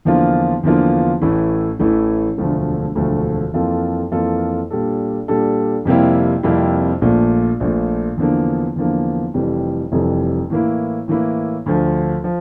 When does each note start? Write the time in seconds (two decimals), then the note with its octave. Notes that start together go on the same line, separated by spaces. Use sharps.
0.05 E2 D3 F3 A#3 F4
0.63 E2 D3 F3 A#3 F4
1.21 A1 A2 E3 A3 E4
1.79 A1 A2 E3 A3 E4
2.38 E1 D2 D3 F3 A3
2.95 E1 D2 D3 F3 A3
3.53 F2 E3 A#3 F4 A4
4.12 F2 E3 A#3 F4 A4
4.70 A#2 G3 D4 A4
5.28 A#2 G3 D4 A4
5.85 F2 C3 G3 A#3 E4
6.43 F2 C3 G3 A#3 E4
7.01 A#1 A#2 A3
7.60 A#1 A#2 A3
8.17 E2 D3 F3 A#3
8.76 E2 D3 F3 A#3
9.34 F1 F2 E3 G3
9.92 F1 F2 E3 G3
10.50 A2 E3 A#3 E4
11.08 A2 E3 A#3 E4
11.66 D2 D3 F3
12.24 F3